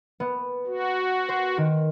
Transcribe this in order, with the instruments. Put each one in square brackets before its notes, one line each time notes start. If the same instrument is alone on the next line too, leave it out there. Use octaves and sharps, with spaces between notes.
[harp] B3
[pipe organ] F#4
[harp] C5
D#3